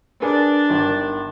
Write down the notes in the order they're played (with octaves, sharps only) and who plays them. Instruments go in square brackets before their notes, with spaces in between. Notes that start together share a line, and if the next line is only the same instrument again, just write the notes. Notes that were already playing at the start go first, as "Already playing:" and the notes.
[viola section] D4 [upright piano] G#4 A#4 B4
[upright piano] G1 D#3